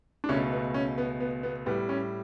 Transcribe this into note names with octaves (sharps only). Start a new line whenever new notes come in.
D4
C#2 B2 A3 C#4
B3
C#4
B3
B3
B3
A2 G3 B3
C#4